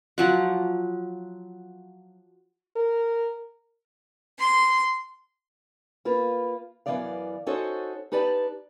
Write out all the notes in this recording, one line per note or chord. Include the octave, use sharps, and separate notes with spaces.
F3 F#3 F#5
A#4
C6
A#3 F4 B4
F#2 C#3 E3 B3 D5 F5
C#4 D#4 F#4 A4 C5 C#5
D#4 G4 B4 D5 A5